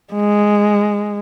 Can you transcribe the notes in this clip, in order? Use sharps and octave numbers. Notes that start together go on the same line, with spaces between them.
G#3